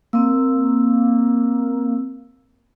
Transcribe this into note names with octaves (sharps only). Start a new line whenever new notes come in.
A#3 C4 E6